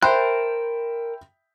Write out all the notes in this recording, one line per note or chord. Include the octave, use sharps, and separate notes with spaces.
A#4 C5 E5 G5 A5 B5 F#6